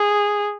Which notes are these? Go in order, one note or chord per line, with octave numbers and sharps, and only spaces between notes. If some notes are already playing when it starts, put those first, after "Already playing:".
Already playing: G#4